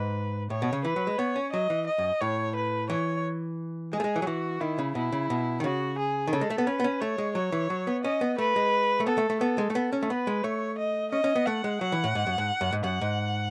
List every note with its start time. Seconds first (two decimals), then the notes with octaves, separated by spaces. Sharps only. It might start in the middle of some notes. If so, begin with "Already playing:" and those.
Already playing: G#2 B4
0.50 A2 C#5
0.62 B2
0.73 C#3
0.85 E3 B4
0.96 F#3
1.07 G#3
1.19 B3 C#5
1.36 C#4
1.53 F#3 D#5
1.70 E3
1.87 D#5
1.98 F#2
2.21 A2 C#5
2.56 B4
2.90 E3 C#5
3.93 G#3 G#4
4.00 A3
4.04 G#3
4.16 E3
4.22 F#3
4.27 E3 F#4
4.61 D#3 E4
4.79 C#3
4.95 B2 E4
5.12 C#3
5.30 B2
5.60 D#3
5.64 C#3 F#4
5.99 G#4
6.27 D#3
6.33 C#3 A4
6.41 G#3
6.50 A3
6.58 B3
6.67 C#4 B4
6.80 B3
6.84 C#4
7.01 A3 C#5
7.18 G#3
7.35 F#3 C#5
7.52 E3
7.70 F#3
7.87 B3
8.04 C#4 D#5
8.21 B3
8.38 A3 B4
8.56 G#3
9.00 A3
9.07 B3 A4
9.18 A3
9.30 A3
9.40 B3 A4
9.58 G#3
9.70 A3
9.75 B3 A4
9.93 C#4
10.03 A3
10.10 B3 B4
10.27 G#3
10.44 A3 C#5
10.78 D#5
11.12 C#4 D#5
11.24 C#4
11.36 B3
11.46 A3 F#5
11.64 G#3
11.81 F#3 F#5
11.92 E3
12.04 A2
12.15 G#2
12.27 F#2
12.38 G#2
12.61 F#2
12.73 G#2
12.84 F#2 F#5
13.01 G#2